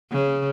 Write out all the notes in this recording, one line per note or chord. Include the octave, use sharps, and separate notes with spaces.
C#3